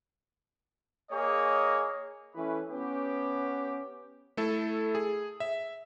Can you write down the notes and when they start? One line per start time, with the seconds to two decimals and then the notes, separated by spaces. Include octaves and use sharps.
1.11 A#3 G#4 C#5 D#5
2.35 E3 A3 C#4 E4 B4
2.70 B3 C#4 G4
4.37 A3 E4 A4
4.95 G#4
5.40 E5